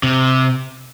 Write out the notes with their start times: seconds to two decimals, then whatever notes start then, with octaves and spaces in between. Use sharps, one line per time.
0.03 C3